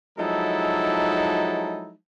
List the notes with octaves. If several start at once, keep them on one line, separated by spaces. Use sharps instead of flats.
F3 F#3 G#3 D#4 E4 A4